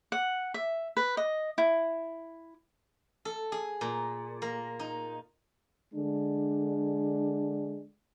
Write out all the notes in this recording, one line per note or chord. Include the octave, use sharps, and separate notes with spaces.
F#5
E5
B4
D#5
E4
A4
G#4
A#2
A#3
D#4
D3 G#3 D4